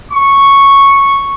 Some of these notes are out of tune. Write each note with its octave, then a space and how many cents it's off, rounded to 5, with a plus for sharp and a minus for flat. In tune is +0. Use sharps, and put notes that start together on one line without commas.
C#6 -5